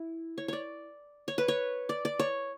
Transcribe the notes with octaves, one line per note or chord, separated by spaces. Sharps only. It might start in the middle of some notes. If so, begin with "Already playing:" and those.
Already playing: E4
C#5
C#5 D5
C#5
B4
C#5
D5
D5
C#5